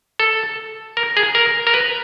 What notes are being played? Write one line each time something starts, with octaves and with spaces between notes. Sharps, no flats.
A4
A#4
G#4
A#4
A#4
B4